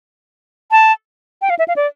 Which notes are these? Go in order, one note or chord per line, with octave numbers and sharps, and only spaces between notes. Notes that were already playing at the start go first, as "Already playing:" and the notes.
A5
G5
F5
E5
F5
D5